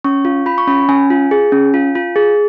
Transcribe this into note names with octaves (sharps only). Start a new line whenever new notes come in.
C#4 C#6
F4
F4 B5
C#6
C#4 B5
C#4 G#5
F4
G#4
C#4
F4
F4
G#4